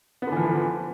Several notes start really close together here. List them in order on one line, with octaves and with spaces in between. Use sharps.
B3 D3 E3 F3